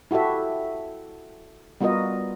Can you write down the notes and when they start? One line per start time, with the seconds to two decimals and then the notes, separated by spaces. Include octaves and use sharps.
0.11 E4 F#4 G4 A4 E5
1.80 G3 B3 F4 F#4 A#4 D#5